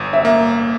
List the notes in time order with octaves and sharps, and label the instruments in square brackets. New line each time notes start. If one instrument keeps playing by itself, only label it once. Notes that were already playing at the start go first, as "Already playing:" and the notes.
Already playing: [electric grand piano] G1
[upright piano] E5
[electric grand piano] A#3